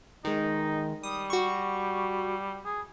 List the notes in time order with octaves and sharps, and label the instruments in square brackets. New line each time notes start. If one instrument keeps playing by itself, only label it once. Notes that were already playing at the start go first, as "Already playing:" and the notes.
[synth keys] D#3 G#3 [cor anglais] D#4
[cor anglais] G3 [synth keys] D#6
[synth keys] F#4 C#6
[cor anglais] G#4